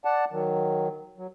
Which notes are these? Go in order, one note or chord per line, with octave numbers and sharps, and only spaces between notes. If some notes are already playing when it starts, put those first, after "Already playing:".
D5 F#5 A5
D#3 F#3
F#3